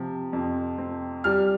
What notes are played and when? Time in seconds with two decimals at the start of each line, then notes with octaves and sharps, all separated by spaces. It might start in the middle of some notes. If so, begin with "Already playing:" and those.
Already playing: C3 F3
0.33 F2
0.78 C4
1.24 G3 F6